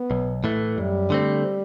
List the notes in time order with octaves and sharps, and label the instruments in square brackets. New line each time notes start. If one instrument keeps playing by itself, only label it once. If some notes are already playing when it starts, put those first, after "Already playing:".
Already playing: [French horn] B3
[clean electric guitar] B1
A2 E3 A3
[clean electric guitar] F#2 [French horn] G3
[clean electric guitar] D3 A3 C4